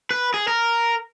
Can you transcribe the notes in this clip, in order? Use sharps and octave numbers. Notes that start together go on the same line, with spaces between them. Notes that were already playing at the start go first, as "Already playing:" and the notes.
B4
G#4
A#4